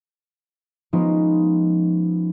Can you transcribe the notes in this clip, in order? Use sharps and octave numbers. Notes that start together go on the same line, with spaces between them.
F3 G#3 B3 C#4 D#4 F4